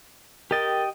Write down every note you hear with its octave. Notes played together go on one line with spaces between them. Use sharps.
G4 A#4 D#5 G5 A6